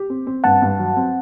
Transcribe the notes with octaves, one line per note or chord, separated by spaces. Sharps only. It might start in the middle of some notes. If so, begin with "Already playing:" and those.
Already playing: G4
C4
C4
G2 F#5 A5
G2
F#3
C4